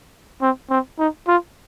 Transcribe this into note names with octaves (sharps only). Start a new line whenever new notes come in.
C4
C4
D#4
F4